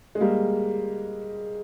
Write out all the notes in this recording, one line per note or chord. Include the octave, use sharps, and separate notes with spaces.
G#3
G3 A#3